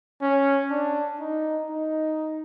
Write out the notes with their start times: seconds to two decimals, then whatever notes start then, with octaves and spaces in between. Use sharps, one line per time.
0.21 C#4
0.70 D4
1.20 D#4
1.69 D#4